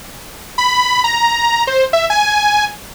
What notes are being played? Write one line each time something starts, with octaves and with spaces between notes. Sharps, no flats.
B5
A#5
C5
E5
G#5